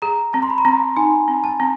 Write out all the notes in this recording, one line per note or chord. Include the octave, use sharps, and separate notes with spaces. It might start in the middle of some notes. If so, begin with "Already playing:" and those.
G#4 A#5
C4 A5
C6
B5
A#5
C4 A5
D#4 G#5
C4
A5
C4